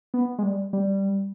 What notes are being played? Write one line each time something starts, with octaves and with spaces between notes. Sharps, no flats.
B3
G#3
G3
G3